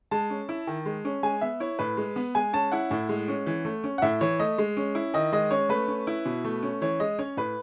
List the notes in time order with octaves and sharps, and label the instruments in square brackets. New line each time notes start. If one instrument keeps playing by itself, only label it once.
[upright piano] G#3 A5
C#4
E4
D#3
G#3
C#4
G#3 G#5
B3 E5
E4 C#5
A2 B4
G#3
B3
G#3 G#5
C#4 A5
E4 F#5
A2
G#3
C#4
E3
A3
C#4
F#5
A2 E5
E3 C#5
A3 D#5
G#3
C#4
E4
D#3 D#5
G#3 D#5
C#4 C#5
A3 B4
C#4
E4
B2
A3
C#4
E3 C#5
G#3 D#5
C#4 C#5
A2 B4